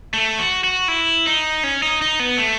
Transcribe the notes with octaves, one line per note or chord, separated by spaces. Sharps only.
A3
F#4
F#4
E4
D#4
C#4
D#4
D#4
B3
A3